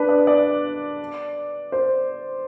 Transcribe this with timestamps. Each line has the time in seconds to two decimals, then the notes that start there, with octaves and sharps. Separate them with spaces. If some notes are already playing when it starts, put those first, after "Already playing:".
Already playing: D4 B4
0.09 D5
0.27 D5
1.72 C5